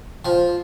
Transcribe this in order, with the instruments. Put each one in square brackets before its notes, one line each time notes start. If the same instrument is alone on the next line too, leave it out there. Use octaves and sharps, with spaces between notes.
[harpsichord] F3